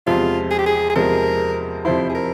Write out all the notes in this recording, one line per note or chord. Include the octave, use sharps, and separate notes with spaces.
E2 C3 F3 G#3 C4 F4
G#4
G4
G#4
G#4
E2 C3 F3 G#3 C4 A#4
F2 C3 F3 C4 E4 C5
G#4
A#4